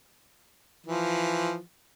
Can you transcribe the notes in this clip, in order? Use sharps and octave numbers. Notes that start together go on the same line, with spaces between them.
E3 F3